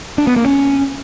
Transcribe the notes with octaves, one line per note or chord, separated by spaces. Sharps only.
D4
B3
A#3
C#4